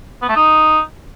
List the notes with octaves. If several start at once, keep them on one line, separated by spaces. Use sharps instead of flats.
B3
A3
D#4